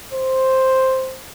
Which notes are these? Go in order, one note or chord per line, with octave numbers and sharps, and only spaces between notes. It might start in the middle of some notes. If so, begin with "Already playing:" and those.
C5